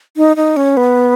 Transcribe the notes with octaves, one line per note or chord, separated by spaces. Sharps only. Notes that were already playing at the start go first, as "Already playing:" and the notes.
D#4
D#4
C#4
B3